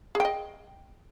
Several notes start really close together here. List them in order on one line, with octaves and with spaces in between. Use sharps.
G#4 G5 D#5